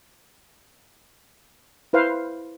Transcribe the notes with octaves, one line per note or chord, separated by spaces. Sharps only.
E4 B4 C5 F5